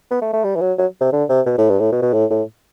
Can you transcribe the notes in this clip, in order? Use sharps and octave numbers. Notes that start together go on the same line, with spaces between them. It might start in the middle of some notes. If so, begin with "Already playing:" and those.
B3
A3
A3
G3
E3
F#3
F#3
C3
D3
C3
B2
A2
G2
A2
B2
B2
A2
A2